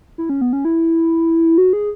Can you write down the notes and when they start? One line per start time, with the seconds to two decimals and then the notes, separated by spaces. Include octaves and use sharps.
0.18 E4
0.29 C#4
0.41 B3
0.53 C#4
0.65 E4
1.58 F#4
1.73 G#4